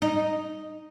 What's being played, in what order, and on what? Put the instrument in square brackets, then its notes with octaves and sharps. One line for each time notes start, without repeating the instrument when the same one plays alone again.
[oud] D#4